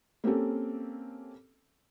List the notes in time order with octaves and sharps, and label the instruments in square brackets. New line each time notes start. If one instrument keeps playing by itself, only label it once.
[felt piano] A#3 C4 C#4 G4 A4